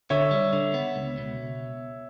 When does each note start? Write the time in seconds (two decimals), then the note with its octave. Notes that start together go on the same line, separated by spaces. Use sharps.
0.10 D3 C#5 E5
0.31 G3
0.53 D3
0.74 B3
0.96 C#2
1.18 B2